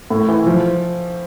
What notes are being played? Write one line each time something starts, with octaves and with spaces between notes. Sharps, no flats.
A2
E3
F3